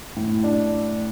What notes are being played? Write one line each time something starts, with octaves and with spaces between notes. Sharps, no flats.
A2
D4